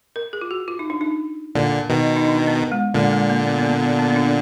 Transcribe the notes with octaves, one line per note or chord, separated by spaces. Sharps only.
A#4
G#4
F4
F#4
F4
D#4
D4
D#4
A#2 D3
B2 D#3
D#4
D4
B3
G#3
A#2 D3 G#3
G#3
A#3
B3
B3
A#3
B3
B3
B3
D4